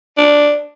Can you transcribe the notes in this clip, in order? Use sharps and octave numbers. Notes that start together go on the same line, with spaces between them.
D4